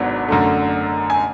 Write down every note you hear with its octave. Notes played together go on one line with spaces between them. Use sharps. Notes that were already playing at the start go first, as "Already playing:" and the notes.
Already playing: G#1 G#2 F#3 B3 D4 F#5
F#2 D3 A3
G#5